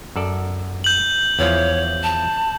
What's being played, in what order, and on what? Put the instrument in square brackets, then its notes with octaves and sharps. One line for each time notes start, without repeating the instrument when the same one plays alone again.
[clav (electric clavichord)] F#2 A4 D5
[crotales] G6 F#7
[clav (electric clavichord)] E2 E3 F3 [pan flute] C#5
[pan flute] A5